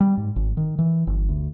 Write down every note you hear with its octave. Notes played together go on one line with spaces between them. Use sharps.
G3
G#2
G#1
D#3
E3
G1
D2